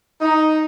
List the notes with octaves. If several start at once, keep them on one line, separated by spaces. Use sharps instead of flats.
D#4